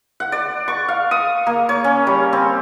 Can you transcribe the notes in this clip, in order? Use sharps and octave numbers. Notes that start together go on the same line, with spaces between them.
F#5
D5
C#6
F5
D#6
A#3
C#5
C#4
G3
C4